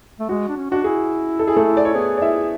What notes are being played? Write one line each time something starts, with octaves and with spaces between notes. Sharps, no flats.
A3
G#3 F#4
D4
C#4
D4 F#4
E4 G#4
A4
G#4
A3 A4
D5
C#5
B3 G#4 B4
D5
E4 E5